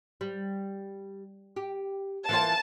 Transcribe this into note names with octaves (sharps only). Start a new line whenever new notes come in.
G3
G4
E3 A#3 F4 A5